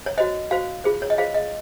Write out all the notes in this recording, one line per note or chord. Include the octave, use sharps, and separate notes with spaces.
C#5
F#4 C5 D#5
F#4 C5 F5
F4 G#4 C5
C#5
D#5
F4 G#4 C5 F5
D#5